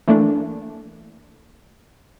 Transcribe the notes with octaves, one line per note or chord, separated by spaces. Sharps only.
E3 A3 A#3 D4